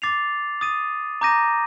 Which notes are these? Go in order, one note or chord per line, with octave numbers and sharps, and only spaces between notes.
D6 A6 C7 F7
D#6 A6 D#7
A#5 D6 G6 A#6 D#7